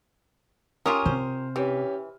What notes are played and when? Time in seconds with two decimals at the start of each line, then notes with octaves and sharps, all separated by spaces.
0.86 C#4 F4 G4 A#4 D#6 F6
1.06 C3 C5
1.56 E3 C#4 G4